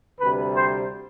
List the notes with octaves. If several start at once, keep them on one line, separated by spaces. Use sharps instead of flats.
D2 C3 G3 B4
C5